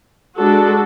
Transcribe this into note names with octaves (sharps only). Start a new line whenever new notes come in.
G#3 D4 F#4 A4